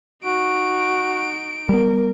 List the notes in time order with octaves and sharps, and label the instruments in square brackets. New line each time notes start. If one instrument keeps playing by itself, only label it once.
[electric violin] D#4 D7 [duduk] F#4
[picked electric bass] G3 B3 [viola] A#4